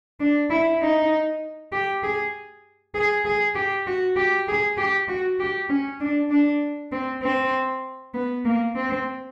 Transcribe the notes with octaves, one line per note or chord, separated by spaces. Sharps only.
D4
E4
D#4
G4
G#4
G#4
G#4
G4
F#4
G4
G#4
G4
F#4
G4
C#4
D4
D4
C4
C4
B3
A#3
C4